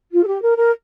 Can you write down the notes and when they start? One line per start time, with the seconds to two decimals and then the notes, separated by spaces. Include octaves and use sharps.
0.12 F4
0.22 A4
0.27 G4
0.41 A#4
0.57 A#4